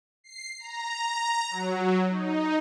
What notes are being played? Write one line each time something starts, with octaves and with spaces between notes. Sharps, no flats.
C7
A#5
A#5
F#3
D#4